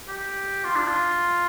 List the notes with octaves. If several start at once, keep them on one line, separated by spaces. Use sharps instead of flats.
G4
F4
D4
F4